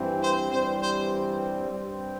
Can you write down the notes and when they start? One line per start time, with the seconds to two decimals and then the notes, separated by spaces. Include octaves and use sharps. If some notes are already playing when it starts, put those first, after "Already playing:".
Already playing: G2 E3 C4
0.22 C5
0.51 G2 E3 G3 C4 C5
0.81 C5
1.69 G2 G3 C4